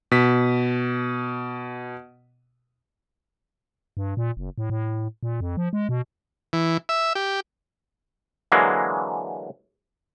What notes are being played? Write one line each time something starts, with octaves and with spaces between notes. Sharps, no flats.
B2 B6
G2
A#2
F#1
A2
A2
A#2
F2
F3
G#3
B2
E3
E5
G4
D3 E3 F#3 G#3 A#3